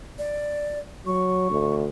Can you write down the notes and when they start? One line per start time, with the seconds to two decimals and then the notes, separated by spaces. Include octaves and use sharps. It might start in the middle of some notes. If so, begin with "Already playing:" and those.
0.19 D5
1.07 F#3 C#6
1.50 D2